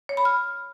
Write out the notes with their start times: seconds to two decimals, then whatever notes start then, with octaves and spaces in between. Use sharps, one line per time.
0.09 C#5
0.17 B5
0.25 F6